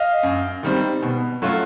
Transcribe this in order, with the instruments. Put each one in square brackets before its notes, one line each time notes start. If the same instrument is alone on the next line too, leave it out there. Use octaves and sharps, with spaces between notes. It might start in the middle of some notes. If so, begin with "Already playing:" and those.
Already playing: [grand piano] D#5 F5
F#2
D#3 G3 C4
B2
F#3 A3 C#4 F4